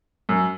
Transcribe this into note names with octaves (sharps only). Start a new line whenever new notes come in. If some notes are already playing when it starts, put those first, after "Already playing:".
F#2